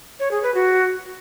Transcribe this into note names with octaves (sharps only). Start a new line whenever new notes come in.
C#5
G#4
B4
F#4